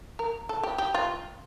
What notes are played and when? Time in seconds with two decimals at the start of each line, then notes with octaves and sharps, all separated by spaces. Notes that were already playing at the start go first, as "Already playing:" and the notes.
0.19 A#4
0.49 A4
0.63 G4
0.78 G4
0.94 F4